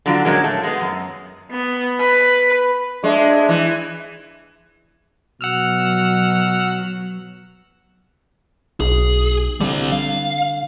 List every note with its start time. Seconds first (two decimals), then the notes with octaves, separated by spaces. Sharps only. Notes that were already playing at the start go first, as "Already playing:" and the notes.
0.06 D3 F#3 D4 F4
0.25 A#2 F#3 G#3 C#4
0.44 A3 A4
0.63 G#3 B3
0.81 F#2
1.51 B3
2.00 B4
3.04 G#3 D4 E5
3.49 E3
5.41 B2 F#3 F#5 E6 F6
8.80 B1 G#4
9.61 D3 G3 C4
9.92 F5